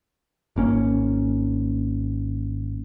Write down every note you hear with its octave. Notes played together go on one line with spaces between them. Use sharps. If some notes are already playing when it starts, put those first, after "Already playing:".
G#1 A#3 C#4